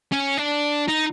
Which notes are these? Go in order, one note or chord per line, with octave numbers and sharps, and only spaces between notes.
C#4
D4
D#4